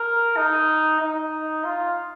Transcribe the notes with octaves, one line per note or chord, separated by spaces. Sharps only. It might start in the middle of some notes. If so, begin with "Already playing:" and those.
Already playing: A#4
D#4
D#4
F4